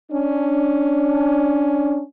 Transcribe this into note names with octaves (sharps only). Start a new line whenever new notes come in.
C#4 D4